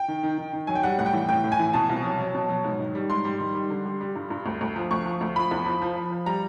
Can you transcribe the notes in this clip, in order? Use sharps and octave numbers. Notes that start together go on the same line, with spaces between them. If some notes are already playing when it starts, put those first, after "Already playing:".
Already playing: G5
D#3
D#3
D#3
D#3
F#3 G#5
G5
G3 F#5
A2 F#5
G5
E3
A2 G5
A2
G#5
E3
B2 A5
C2
F#3
F#3
B2
F#3
G#2
D#3
G3
G#2 C6
G3
D#3
G3
D3
G3
G3
G2
G2
D2
D2
F3
D2 C#6
F3
D2
F3 B5
E2
F3
F3
F3
F3
G3 A#5